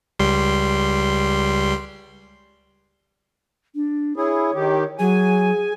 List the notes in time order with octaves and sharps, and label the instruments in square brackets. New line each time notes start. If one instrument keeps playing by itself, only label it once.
[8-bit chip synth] C#2 G3 C6
[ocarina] D4
[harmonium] E4 G#4 [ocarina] C#5
[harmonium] D#3 G4
[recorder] F#3 [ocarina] G#4 [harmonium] G#5